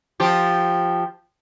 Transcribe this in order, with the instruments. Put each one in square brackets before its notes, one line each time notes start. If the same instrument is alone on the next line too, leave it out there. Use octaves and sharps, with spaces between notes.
[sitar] F3 G4